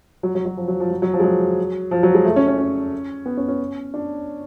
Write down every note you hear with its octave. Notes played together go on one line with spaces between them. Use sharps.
F#3
F#3
F#3
F3
F#3
F3
F#3
F#3
F3
G#3
F#3
F3
F#3
G#3
A3
C#4
C#4
C#4
B3
C#4
C#4
D4